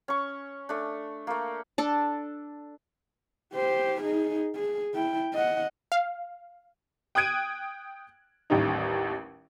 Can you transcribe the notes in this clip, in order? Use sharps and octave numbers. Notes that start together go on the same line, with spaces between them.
C#4 C#6
A3 D4
A3 A#3
D4 A4
G4 C5
D#4 G#4
G#4
E4 G5
D#5 F#5
F5
G5 D#6 F#6 G#6 D7 D#7
A1 D#2 D#3 G3 D#4